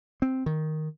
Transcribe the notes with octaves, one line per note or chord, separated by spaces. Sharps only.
C4
D#3